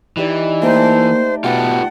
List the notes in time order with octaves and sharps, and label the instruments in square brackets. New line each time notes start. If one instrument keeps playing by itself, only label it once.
[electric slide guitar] E3 [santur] D#4 G4 D5
[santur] A3 G5 A#5 [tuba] A#3 [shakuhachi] C5
[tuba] B2 [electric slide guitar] F4 G4 B4 [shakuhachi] F#5 [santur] G5 A5